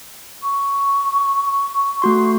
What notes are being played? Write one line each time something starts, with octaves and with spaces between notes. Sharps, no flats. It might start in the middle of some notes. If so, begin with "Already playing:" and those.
C#6
A3 F#4 C6